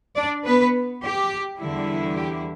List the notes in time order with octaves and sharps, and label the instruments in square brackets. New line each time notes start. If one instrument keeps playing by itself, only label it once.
[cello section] D4 D5
B3 B4
G4
E2 D3 G3 E4
G4